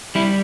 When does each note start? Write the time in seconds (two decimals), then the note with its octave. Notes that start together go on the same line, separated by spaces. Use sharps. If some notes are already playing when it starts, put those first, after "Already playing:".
0.15 G3 E4